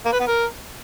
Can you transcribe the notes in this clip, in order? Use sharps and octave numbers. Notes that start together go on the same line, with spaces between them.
A#3
B4
B3
A#4